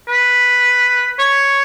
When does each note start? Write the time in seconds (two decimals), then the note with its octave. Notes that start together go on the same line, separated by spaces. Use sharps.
0.08 B4
1.19 C#5